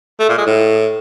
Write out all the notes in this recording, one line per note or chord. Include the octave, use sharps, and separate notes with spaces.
A3
A#2
G#3
A2